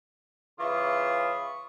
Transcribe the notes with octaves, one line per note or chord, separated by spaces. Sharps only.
C#3 E3 F4 B5 C#6 D#6